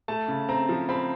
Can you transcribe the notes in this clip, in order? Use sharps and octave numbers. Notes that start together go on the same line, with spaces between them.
A3 A5
C#3
C4 A#5
F3
C4 B5